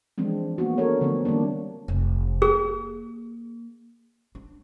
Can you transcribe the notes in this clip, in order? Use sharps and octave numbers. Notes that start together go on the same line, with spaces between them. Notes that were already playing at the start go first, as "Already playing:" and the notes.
E3 F3 G#3 C4 D4
A#3 B3 F#4
D4 A4 A#4 C#5
D3 F3 A3 B3 C4 D4
D#3 G3 A#3 D4
F1
A#3 G#4
D4